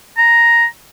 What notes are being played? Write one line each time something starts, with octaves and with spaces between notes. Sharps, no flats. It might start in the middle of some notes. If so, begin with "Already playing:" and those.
A#5